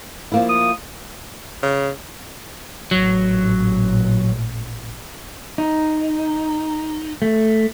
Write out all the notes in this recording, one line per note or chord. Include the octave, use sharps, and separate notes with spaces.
F3 A#3 E4
D#6
C#3
A1 A#2 F#3
D#4
A3